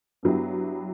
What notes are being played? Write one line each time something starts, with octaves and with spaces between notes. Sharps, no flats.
G2 F#3 B3 E4 G4